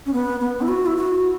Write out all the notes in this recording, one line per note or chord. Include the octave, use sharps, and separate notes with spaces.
C#4
B3
B3
E4
F#4
E4
F#4